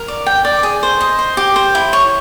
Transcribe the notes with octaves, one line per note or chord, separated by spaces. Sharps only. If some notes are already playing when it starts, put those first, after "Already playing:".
Already playing: A#4
D5
G5
D5
G#4
C5
D#5
C5
G4
C5
E4
C#5